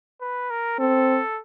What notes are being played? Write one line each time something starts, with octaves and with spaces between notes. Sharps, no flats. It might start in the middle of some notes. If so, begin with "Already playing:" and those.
B4
A#4
C4 A4